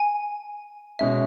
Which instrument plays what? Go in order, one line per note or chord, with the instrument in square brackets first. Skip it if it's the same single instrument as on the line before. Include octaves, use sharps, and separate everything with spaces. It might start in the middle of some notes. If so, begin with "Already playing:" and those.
Already playing: [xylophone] G#5
[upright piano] B2 G#3 C#4 [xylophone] E5